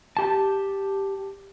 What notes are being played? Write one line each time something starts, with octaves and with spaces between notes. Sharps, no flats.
G4 A5